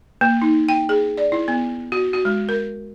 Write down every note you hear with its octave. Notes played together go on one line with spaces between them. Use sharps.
A#3
D#4
G5
G#4
D5
E4
B3
F#4
F#4
G#3
A#4